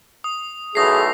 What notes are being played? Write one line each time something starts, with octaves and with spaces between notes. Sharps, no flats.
D#6
B1 E3 A3 G#4 D#6 A#6 C7